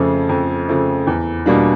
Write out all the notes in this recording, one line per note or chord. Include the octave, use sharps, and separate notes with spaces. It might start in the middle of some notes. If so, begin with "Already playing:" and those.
Already playing: F2 C#3 F3 A3
F2
C#3 F3 A3
E2
B2 G3 A#3 D4